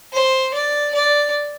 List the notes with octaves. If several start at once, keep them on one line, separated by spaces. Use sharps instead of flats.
C5
D5
D5